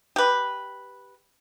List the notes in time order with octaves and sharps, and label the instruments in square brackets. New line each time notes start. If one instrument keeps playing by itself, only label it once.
[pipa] G4 B4